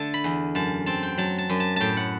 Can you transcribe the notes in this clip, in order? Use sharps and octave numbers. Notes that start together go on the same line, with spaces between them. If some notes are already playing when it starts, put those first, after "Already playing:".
Already playing: D3 A3 A5
B5
E2
F#2 A5
C4 A5
G5
F#3 A5
A5
F#2
A5
A2 G5 A5
F#5